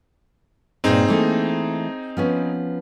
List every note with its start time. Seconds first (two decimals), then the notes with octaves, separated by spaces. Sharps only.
0.84 G2 A#2 C4 D#4 G#4
1.08 E3 A3 A#3
2.17 F3 B3 C#4